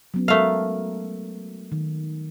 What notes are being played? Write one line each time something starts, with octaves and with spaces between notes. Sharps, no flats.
F#3 B3 C#4
G#3 A3 A4 A#4 F5
D#3